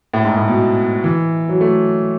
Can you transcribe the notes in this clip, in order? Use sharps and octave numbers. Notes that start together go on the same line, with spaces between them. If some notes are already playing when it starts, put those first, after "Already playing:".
A2
G#2
A2
B2
E3
F#3
A3